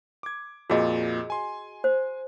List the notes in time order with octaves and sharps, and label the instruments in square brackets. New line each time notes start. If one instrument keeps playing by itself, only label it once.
[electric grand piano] D6 G#6
[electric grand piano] F2 A#2 [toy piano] F#4 G#4 D#5
[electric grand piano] G#5 C6
[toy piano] C5